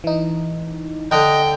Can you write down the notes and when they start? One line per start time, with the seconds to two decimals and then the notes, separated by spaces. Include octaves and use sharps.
0.04 E3 D#4
1.12 D3 D#5 G5